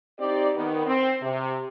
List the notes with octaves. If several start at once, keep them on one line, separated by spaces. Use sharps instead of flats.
C4 D#4 G4 D5
D#3 B3
C4
C3